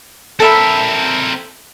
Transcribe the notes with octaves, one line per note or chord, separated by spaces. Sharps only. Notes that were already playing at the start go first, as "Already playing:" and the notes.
C4 A4 A#4 E5 B5